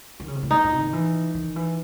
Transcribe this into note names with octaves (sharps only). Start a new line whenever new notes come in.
D#3
C#3
C3
A2
G#2 D#4
A2
D#3
E3
D#3
E3